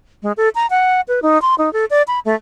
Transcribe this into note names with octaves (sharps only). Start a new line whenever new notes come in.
G#3
A4
A#5
F#5
B4
D#4
C6
D#4
A4
D5
B5
A3